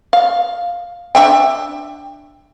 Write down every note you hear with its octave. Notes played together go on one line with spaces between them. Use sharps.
F5
D4 E5 G5